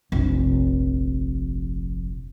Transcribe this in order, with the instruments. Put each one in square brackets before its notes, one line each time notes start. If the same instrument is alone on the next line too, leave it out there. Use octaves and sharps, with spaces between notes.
[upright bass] F1 A#1